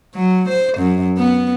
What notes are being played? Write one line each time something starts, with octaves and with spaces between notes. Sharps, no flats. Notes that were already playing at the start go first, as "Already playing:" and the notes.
F#3
C5
F#2
B3